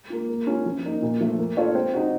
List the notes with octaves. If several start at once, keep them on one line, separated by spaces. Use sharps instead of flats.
A#3 F4
A#3
C#4 F4
F3
A#3 D#4
A#2
F3 A3
A#3
F4 A4 C#5 F5
C4
D#4 F#4